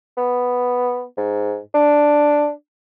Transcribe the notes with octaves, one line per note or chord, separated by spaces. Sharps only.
B3
G#2
D4